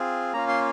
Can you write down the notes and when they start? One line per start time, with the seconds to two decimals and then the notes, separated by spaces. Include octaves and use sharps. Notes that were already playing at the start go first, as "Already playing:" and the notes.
Already playing: C4 F4 G#4
0.33 A#3 C#4 F4 A#5
0.49 C6